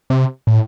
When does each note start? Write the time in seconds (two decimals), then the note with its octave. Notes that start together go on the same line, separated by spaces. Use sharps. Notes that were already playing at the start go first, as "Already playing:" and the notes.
0.10 C3
0.47 A2